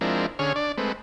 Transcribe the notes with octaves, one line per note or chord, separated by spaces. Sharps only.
F3 G#3 C4 D4 E4 A#4
D3 C#4 G#4 C#5 F6
D4 D5
G#3 A3 C4 B4